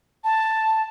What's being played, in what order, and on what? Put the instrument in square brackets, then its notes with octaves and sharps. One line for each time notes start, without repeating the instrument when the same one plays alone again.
[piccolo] A5